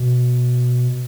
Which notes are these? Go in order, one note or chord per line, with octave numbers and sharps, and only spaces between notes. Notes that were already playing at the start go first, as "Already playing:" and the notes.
Already playing: B2